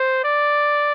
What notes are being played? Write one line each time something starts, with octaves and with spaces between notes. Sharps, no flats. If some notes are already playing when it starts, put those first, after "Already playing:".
Already playing: C5
D5